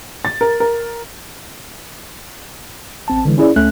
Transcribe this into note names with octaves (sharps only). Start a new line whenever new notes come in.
A6
A#4
A#4
A1 C4 A5
D3 E3 G#3
C#4 E4 G#4 D5
D2 A3 C#4 F#6